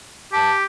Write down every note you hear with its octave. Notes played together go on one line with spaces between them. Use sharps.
G4 A5